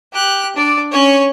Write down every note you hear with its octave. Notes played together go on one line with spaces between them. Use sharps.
G4 F#6
D4 D5
C#4 C#5